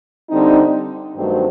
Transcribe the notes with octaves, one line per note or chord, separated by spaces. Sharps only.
D3 G3 C4 D#4
G2 D#3 F#3 A3 C4